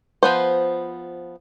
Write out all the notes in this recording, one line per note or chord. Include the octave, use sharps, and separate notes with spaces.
F3 B3 C5